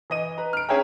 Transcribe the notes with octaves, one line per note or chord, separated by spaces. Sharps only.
E3 D#5 D#7
B4 A#5
F6 D7
C#4 G#4 C#5 E5 G5 A#5